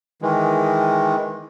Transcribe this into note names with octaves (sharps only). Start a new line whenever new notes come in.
D#3 E3 G#3